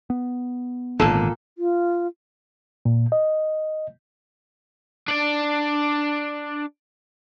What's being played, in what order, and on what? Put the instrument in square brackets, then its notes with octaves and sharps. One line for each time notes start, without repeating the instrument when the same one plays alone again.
[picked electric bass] B3
[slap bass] G#1 D3 [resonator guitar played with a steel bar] A#2 A4
[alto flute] F4
[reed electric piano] A#2
D#5
[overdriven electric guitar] D4 D5